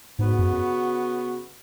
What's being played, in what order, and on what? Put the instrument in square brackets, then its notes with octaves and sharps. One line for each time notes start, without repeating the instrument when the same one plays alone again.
[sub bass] G#2 [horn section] C#3 B3 F#4
[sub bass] F#2